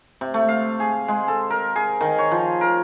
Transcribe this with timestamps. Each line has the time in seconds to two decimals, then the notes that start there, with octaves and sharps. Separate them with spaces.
0.21 C3
0.34 A3
0.48 F5
0.80 G#4
1.08 G#3
1.28 A4
1.50 A#4
1.76 G#4
2.01 D#3
2.18 C#5
2.31 F3
2.61 A#4